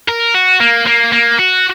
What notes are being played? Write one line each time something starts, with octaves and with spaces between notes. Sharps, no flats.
A#4
F#4
A#3
A#3
A#3
F#4